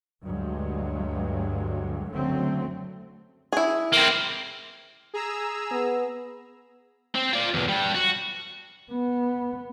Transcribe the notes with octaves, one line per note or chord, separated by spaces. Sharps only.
D2 G2 F#3 G#3
F#1 D3 F#3 A3 C4
E4 G#4
A#3 C4
G#4 A#5 E6
B3
C4
F4 D5
B1 E2
G3 D4
F#4
B3